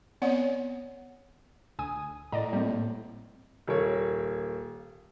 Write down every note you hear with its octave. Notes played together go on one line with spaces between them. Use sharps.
B3 C4 C#5 D5 F#5
D2 G#5 D#6
A2 D5 D#5 A#5
G3 A#3 C4
D#1 A#3 C#5